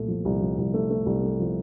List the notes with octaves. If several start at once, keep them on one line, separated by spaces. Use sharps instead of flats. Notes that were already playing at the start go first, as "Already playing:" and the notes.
Already playing: C2 A#2 A3
F3
C2
F3
C2
A3
A3
C2
A3
F3